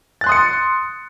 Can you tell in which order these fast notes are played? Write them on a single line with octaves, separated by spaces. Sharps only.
A6 F#6 C6 D#6 C#7